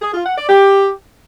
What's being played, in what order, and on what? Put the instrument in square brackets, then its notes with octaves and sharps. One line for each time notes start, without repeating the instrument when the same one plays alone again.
[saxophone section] G#4
F4
F#5
D5
G4